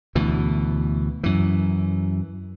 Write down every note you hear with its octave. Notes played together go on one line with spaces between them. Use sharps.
D2 B2 E3
F#2 E3